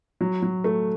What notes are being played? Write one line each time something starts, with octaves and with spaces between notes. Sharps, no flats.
F#3
F#3
A3